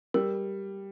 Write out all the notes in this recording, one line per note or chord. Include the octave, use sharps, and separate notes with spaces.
G3 A#4